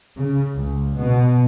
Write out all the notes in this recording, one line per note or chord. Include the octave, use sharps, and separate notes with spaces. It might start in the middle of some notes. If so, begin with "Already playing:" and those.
C#3
C#2
B2